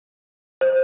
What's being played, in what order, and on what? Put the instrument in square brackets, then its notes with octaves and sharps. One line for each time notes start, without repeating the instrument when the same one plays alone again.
[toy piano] C5